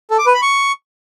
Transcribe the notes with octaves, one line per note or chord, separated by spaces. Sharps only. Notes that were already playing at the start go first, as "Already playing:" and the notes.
A4
D6
B4
B5
C#6